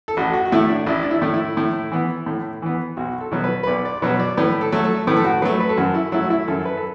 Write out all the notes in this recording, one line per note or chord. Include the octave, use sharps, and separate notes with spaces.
A4
A1 F#4
F#4
F#4
A2 A3 E4
D4
A1 E4
D4
E4
A2 A3
E4
A2
E3 B3
A2
E3 B3
B1 F#4
A4
B2 F#3 B3
B4
B4
B1 D5
D5
B2 F#3 B3 B4
D5
A2 B4
A4
F#3 A3
A4
A2 B4
A4
F#4
F#3 A3 B4
B4
A4
F#2 F#4
E4
F#3 A3 E4
F#4
E4
F#2 A4
B4
A4